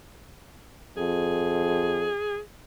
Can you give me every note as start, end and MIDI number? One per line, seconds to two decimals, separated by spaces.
0.97 2.09 41
0.97 2.39 68